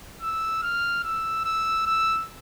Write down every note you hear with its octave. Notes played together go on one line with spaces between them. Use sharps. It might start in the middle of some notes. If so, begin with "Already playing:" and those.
E6
F6
E6
E6
E6